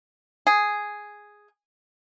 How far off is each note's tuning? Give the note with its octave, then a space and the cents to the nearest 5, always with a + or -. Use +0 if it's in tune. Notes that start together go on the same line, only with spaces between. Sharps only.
G#4 +0